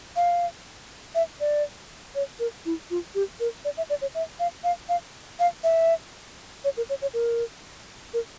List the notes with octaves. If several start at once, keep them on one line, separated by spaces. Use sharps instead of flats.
F5
E5
D5
C#5
A#4
E4
F4
G4
A#4
D5
E5
D5
C#5
E5
F5
F5
F5
F5
E5
C#5
A#4
C#5
C#5
A#4
A#4